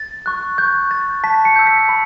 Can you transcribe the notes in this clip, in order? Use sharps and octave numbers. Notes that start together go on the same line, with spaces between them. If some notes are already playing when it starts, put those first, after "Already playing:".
Already playing: A6
C#6 F#6
C#6 G6
G6 A6
A5 B6
C#7
E6 G6
B6
B5